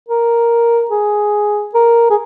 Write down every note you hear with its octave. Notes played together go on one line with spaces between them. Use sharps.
A#4
G#4
A#4
G#4